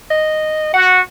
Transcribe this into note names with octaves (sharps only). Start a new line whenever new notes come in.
D#5
F#4 F#5